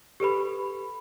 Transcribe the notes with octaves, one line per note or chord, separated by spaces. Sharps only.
G4 A4 B4 B5